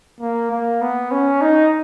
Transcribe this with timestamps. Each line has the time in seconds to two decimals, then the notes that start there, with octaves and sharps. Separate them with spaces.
0.20 A#3
0.51 A#3
0.81 B3
1.11 C#4
1.41 D#4